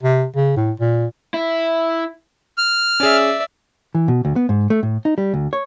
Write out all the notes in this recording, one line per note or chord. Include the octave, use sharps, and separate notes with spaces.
C3
C#3
A2
A#2
E4
F6
C#4 G#4 D5 E5
E3
B2
D2
B3
G#2
A3
A2
D#4
G3
D2
C#5